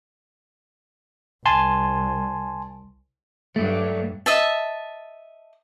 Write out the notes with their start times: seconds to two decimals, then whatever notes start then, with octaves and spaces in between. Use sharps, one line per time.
1.46 C2 G#5 A5 C6
3.56 G2 F#3 A3
4.26 D#5 E5 A5